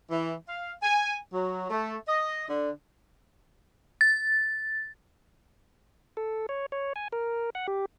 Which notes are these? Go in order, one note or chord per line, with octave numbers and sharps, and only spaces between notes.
E3
F5
G#5
F#3
A3
D#5
D3
A6
A4
C#5
C#5
G#5
A#4
F#5
G4